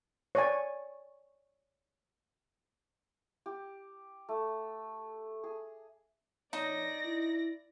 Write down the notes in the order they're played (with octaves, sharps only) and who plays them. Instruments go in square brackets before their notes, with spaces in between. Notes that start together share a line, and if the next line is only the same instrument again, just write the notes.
[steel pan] C#5 D5 G#5
[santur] G4
A3
G#4
[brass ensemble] A#1 C#5 [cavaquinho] D#4 [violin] D5 A#6
[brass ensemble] E4